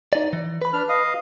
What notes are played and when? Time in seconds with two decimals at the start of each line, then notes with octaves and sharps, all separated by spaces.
0.13 D#4 D5
0.33 E3
0.62 B4 B5
0.73 D4 F6
0.89 D#5 F5 D#6